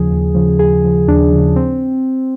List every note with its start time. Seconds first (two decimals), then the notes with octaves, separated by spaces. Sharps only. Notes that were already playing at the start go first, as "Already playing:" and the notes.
Already playing: D#2 C#3 F3 G#4
0.11 D#2
0.35 C#3 F3
0.59 D#2 G#4
0.84 C#3 F3
1.08 D#2 D4
1.32 C#3 F3
1.56 C4